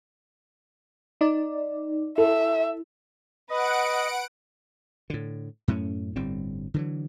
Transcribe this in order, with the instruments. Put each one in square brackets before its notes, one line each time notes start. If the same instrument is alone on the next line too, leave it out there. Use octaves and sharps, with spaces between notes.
[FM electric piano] D#4 D5
[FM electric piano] E4 [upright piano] A4 [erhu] E5
[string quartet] B4 [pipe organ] D#5 [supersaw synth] F#5 D7
[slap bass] A2 D3
F#2 A2 A3 C#4
G1 A2 G3 C4
D3 E3 F#3